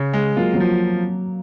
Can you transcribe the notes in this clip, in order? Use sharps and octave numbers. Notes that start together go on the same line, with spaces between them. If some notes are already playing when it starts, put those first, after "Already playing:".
Already playing: C#3
G#3
F#3 A#3 F4
F#3 A#3
F3